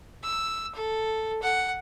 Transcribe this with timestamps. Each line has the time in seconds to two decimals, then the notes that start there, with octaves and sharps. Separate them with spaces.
0.23 E6
0.75 A4
1.42 F#5